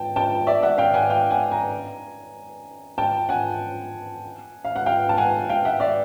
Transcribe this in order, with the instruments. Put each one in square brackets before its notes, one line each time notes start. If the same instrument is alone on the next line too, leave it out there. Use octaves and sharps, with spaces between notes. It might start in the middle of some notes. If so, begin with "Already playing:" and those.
Already playing: [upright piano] G5 A5
G5 A5
D5 E5
E5 F#5
F5 G5
F#5 G#5
F5 G5
F#5 G#5
G#5 A#5
G5 A5
F#5 G#5
F5
F#5
F5 G5
A5
F#5 G#5
F5 G5
E5 F#5
D5 E5